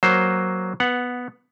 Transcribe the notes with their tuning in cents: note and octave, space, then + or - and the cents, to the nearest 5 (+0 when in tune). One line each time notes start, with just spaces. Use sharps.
F#3 +0 A#3 +0 C5 +0
B3 +0 F#5 -10